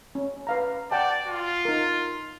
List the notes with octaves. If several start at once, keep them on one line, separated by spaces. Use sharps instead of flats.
C#4
B4 F5 A#5
D5 F#5 G5 A5
F4
D#4 A#4